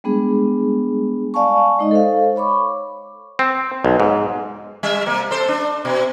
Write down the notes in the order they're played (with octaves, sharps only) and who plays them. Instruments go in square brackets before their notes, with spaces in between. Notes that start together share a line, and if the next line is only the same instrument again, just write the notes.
[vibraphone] G3 G#3 B3 D4 G#4
D5 F5 G#5 A5 C#6
G#3 D#4 D#5
A4 C5 F5
C#5 B5 C#6 D6
[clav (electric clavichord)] C4
B1
G#2
[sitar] G3 E5
C3 A#3
A4 C5
D4
B2